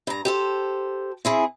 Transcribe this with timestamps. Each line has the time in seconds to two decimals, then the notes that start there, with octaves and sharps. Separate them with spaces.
0.07 G2 A#5
0.25 G4 A4 C5
1.25 C4 E4 G#4